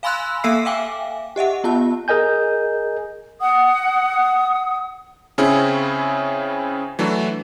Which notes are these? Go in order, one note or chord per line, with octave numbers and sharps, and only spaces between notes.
F5 G#5 B5 C6 E6 F#6
A#3 A4 E5 F5 E6 C7
E5 F5 G5 G#5 D6
G4 D#5 E5 F#5
B3 F4 G4 A5
G#4 A#4 D#5 G#5 G6
F#5 D#6
C#3 C4 C#4 E4 G#4
E3 F#3 A3 D4